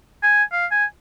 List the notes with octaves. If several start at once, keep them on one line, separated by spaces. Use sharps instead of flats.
G#5
F5
G#5